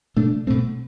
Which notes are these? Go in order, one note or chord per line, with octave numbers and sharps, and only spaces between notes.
B2 A3 D4
B2 A3 C4